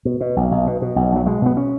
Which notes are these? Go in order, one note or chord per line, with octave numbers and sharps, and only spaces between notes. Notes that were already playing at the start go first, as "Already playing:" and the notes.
B2
B2
B1
B1
B2
B2
B1
B1 F#3
B2 G#3
B2 B3
C#4